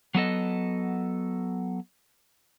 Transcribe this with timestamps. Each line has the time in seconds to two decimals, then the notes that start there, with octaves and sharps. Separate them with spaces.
0.15 F#3 B3 A4 D#5